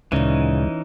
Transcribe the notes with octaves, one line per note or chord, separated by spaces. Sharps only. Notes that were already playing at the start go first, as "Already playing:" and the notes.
D2 A#2 C#3 E3 G#3 C#4 D#4